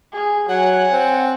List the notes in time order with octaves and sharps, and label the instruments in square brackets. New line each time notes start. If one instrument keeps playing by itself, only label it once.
[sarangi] G#4
[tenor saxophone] F#3 [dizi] F#5 [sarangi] G#5
[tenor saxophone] C4